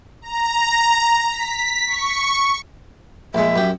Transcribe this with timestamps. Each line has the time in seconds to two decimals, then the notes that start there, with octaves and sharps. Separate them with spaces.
0.22 A#5
1.31 B6
1.87 C#6
3.35 A#1 G#3 E5
3.56 F#2 G4